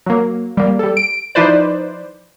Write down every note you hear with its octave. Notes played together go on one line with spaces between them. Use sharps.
F#3 A#3
G3 A#3
G3 A4
D7
F3 D#4 E4 B4 C5 D5